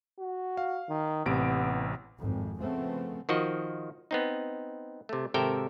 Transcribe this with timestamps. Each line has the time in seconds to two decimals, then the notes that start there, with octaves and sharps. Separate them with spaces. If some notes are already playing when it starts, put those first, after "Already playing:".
0.19 F#4
0.57 F5
0.89 D#3
1.26 A1 C3 B3 D7
2.18 G#1 F2
2.61 C#3 F3 A3 B3 C4
3.29 D#3 F3 F#4 D#5
4.11 B3 C4 D#4
5.09 C3 A3
5.34 G#1 C3 A4 A#4 E5 G5